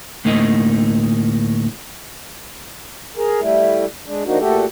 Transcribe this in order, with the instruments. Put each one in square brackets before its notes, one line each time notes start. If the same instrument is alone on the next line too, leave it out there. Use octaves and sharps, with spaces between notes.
[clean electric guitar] D2 A2 A3 A#3 D#4 D#5
[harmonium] G#4 A#4
G3 A3 E4
G#3 D4
F3 A#3 D4 D#4 F#4
A#2 A3 F#4 G4 A4